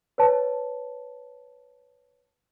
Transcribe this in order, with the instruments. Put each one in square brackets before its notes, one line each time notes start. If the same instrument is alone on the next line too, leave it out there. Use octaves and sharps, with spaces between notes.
[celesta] B4 C#5 A5